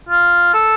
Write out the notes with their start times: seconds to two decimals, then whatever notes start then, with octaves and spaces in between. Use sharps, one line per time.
0.09 F4
0.54 A4